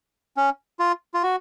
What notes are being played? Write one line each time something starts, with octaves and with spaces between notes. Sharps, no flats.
C#4
F4
F4
F#4